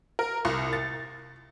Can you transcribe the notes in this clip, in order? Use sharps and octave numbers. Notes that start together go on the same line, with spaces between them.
A#4
C2
A6